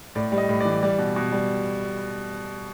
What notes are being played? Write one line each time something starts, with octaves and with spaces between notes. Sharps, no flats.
A2 D5
G3
D#5
A2
D5
E3
G3 D5
B2
B2
G3